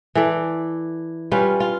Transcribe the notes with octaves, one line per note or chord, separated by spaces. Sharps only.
E3 A4 D5
G3 C#4 F4 B4
F4